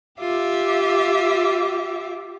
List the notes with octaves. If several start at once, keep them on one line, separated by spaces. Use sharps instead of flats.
F4 G4 E5 D6